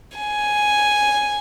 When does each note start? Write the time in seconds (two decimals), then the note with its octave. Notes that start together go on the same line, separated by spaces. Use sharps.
0.18 G#5